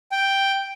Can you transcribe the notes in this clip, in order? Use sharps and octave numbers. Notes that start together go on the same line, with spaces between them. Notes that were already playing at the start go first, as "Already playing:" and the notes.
G5